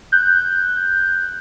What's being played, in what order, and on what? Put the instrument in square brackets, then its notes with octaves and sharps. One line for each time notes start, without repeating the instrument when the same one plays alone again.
[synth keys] F#6 G6